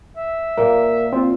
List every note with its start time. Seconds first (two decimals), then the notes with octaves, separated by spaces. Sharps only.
0.17 E5
0.58 A#2 A#3 A#4
1.13 C4 F4